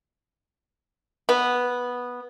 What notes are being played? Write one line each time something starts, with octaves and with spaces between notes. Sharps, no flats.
B3